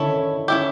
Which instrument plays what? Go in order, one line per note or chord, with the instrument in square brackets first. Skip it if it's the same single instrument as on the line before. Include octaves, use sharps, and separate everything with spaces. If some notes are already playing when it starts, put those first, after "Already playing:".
Already playing: [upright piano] D3 D#3 [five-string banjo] C#4 E4 A4 C#5
[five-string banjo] C#4 E4 G4